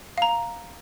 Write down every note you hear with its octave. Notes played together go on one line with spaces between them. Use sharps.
F5 A#5